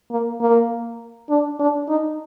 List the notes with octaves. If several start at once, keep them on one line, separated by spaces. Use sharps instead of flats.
A#3
A#3
D4
D4
D#4